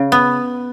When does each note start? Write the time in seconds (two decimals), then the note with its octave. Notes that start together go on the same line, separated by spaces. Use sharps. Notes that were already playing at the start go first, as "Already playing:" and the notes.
Already playing: C#3
0.12 B3